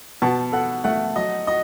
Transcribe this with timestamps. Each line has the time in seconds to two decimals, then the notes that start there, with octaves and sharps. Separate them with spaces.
0.22 B2 A5
0.52 A4 F#5
0.84 A3 F#5
1.15 F#3 D#5
1.47 F#4 D#5